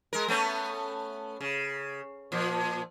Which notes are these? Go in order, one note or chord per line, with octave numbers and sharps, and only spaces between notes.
G#3 A#4
A3 B3 C#4
C#3
A#2 F3